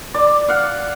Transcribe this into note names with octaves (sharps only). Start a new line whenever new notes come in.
D5
F5 F#5